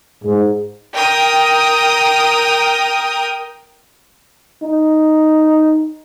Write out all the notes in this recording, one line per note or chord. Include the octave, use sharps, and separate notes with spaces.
G#2
A#4 G5 D#6
D#4